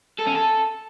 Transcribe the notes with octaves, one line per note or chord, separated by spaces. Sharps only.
A4
C#4
A4